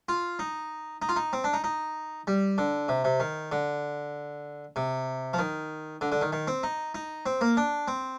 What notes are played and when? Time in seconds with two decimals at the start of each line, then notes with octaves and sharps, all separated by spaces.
0.09 F4
0.39 D#4
1.02 D#4
1.09 F4
1.16 D#4
1.33 C4
1.44 D4
1.53 D#4
1.64 D#4
2.27 G3
2.58 D3
2.89 C3
3.04 C3
3.20 D#3
3.52 D3
4.76 C3
5.33 F3
5.39 D#3
6.01 D3
6.12 D3
6.22 D#3
6.33 D#3
6.47 C4
6.63 D#4
6.95 D#4
7.26 C4
7.41 A#3
7.57 D4
7.88 C4